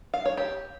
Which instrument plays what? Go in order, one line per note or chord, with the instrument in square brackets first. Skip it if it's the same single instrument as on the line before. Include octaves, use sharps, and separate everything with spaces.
[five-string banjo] F5
C#5
G4